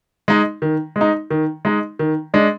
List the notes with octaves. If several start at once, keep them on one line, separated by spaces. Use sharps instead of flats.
G#3 D#4
D#3
G#3
D#4
D#3
G#3 D#4
D#3
G#3 D4